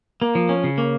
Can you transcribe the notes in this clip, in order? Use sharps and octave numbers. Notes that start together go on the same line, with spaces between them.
A#3
F3
C#4
C#3
A#3